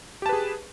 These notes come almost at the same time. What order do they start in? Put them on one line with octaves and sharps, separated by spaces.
G4 A5 B4 G#4